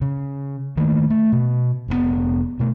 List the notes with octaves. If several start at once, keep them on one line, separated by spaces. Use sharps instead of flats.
C#3
D#3 A3 A#3
A3
B2
F1 A2 B3
B2 A3